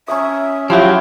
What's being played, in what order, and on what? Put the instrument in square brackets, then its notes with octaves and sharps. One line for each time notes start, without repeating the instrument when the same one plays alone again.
[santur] C#4 A#5 D#6 [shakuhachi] E5
[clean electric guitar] F3 F#3 [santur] E4 F5 G5 [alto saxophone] G4